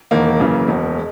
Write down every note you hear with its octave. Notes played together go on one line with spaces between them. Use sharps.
E1 E2 D#3 A#3
F#2 C#3 E3 A#3
E1 E2 B2
G#3